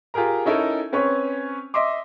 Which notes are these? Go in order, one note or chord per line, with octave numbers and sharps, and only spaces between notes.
F4 G4 G#4 A#4 A#5
C#4 D#4 E4 A4 A#4
C4 C#4 B4 C#5
D#5 E5 C6 D6